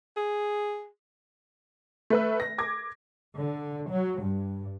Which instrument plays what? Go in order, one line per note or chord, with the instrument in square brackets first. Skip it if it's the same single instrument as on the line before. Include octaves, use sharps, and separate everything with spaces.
[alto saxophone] G#4
[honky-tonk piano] A3 B4 E5
A#6
D6 G#6 A#6
[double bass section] D3
F#3
G2